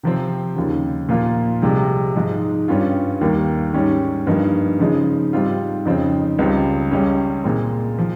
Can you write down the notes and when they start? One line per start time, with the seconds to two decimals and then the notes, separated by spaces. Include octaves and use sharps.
0.03 C3 F3 C4
0.56 D#2 C#3 F3
1.09 A#2 F3 A#3 F4
1.62 C2 C3 F3 G#3
2.15 G#2 F3 G#3 D#4
2.68 G2 G3 C#4 F4
3.21 D#2 D#3 G3 A#3
3.74 G#2 D#3 G3 C#4
4.27 G2 F3 A#3 D#4
4.79 C#3 F3 G#3 D#4
5.33 G#2 G3 C4 F4
5.85 F2 C#3 F3 C4 D#4
6.39 C#2 C#3 G3 C4 F4
6.92 C#2 C#3 G3 C#4
7.44 A#2 G#3 C4
7.99 F3